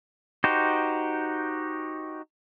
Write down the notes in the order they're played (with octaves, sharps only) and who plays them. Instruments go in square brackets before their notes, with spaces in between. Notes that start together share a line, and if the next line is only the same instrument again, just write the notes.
[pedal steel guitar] D#4 F#4 G4 C5